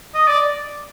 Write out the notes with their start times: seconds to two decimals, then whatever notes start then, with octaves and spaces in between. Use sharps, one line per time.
0.15 D#5
0.28 D5